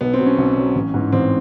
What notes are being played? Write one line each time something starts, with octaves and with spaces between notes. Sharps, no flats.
B1 B3
C4
B2 F#3
C#4
B1
B2 F#3
A1
G#2 E3
A1 C4